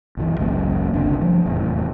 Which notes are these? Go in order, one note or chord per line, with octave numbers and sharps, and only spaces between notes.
B1 F#2 D#3 E3
G#1 C#2 F#2 A#3
G1 C#2 C3 D4
F3 G3 A3
F1 E2 A2